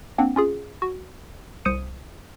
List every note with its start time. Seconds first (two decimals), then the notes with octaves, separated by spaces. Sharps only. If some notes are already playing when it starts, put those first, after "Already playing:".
0.18 A#3 C4 D4 F#5
0.36 C#4 F4 G#4
0.82 F#4
1.65 C2 C5 D#6 C#7 D#7